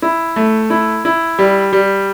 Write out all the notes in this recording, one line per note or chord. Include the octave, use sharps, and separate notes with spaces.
E4
A3
E4
E4
G3
G3